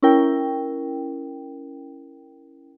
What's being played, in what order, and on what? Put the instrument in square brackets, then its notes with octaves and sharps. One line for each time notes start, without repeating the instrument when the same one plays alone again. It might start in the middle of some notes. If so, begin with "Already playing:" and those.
[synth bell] C#4 E4 A#4 G5